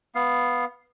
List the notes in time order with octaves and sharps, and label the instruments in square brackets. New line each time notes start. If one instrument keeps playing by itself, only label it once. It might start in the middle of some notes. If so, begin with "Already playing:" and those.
[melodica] B3 F5